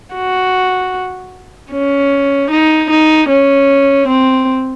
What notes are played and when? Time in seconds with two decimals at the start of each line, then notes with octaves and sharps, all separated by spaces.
0.15 F#4
1.72 C#4
2.51 D#4
2.90 D#4
3.29 C#4
4.08 C4